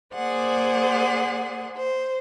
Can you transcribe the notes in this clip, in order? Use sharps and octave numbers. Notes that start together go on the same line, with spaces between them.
A#3 G#4 C5 D5 F#5
C5